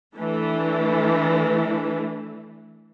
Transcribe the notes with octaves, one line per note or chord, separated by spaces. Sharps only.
E3 A3 D4